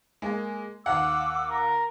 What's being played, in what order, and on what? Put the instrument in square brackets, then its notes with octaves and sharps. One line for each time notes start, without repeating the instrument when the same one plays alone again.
[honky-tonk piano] G#3 A#3
[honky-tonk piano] D#2 F5 F#5 [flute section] D6 E6
[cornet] A#4